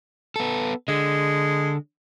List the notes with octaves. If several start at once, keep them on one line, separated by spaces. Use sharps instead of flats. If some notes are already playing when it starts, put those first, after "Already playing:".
B3 A4
D3 G#3